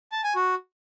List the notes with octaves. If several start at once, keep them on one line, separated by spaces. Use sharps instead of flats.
A5
G#5
F#4